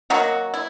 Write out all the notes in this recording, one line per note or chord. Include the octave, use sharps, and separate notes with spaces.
D#3 F#3 A#3 F#4
E4